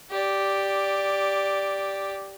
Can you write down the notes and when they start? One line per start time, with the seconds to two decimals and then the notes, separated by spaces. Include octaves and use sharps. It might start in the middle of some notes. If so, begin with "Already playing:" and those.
0.11 G4 D5